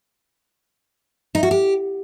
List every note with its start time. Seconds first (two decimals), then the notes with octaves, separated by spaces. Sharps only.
1.35 D#4
1.43 F#4
1.51 G4